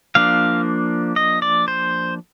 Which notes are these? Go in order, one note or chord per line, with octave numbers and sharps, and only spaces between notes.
F3 A#3 D4 F5
D#5
D5
C5